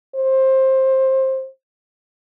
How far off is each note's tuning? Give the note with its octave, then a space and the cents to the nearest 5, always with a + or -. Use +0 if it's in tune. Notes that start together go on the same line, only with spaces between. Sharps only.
C5 +20